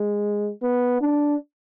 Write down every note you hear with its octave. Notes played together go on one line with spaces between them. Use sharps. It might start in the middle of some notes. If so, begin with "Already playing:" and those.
Already playing: G#3
B3
D4